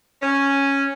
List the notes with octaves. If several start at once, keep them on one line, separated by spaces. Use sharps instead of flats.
C#4